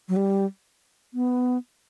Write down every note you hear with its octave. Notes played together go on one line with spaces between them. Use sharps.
F#3
G3
B3